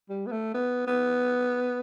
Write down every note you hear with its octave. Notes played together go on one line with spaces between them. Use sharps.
G3
B3
A3
B3
B3